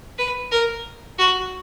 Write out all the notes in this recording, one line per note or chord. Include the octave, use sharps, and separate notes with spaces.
B4
A#4
F#4